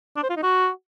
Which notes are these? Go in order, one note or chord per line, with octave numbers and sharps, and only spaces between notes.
D4
C5
F4
D#4
F#4